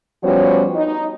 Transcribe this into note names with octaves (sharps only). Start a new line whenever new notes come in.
F3 G3 B3 C#4 F#4 C#5
D#4